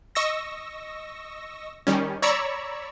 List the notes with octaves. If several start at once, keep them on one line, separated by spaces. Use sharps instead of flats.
D#5 C#6 E6 A#6
D#3 G3 C#4
C#5 D5 A#5 B5 C#6 E6